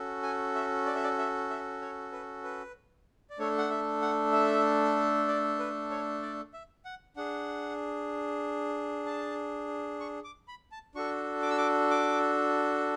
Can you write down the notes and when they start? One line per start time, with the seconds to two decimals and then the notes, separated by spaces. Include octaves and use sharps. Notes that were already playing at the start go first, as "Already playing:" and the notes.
Already playing: C#4 F#4 A4
0.23 G#5
0.55 E5
0.86 D5
0.95 E5
1.03 D5
1.18 E5
1.50 E5
1.81 C#5
2.12 B4
2.44 B4
3.30 D5
3.39 A3 D4 A4 C#5
3.58 F#5
3.71 E5
4.02 F#5
4.32 E5
5.28 D5
5.59 B4
5.91 C#5
6.23 D5
6.53 E5
6.85 F#5
7.16 D4 G#4 F#5
9.06 A5
10.01 C#6
10.24 D6
10.48 B5
10.72 A5
10.95 D4 F#4 A4 C#6
11.42 D6
11.50 E6
11.58 D6
11.90 D6